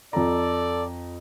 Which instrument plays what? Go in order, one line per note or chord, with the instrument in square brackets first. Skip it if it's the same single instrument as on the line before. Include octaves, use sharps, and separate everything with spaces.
[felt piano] F2 A#5 [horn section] A4 D5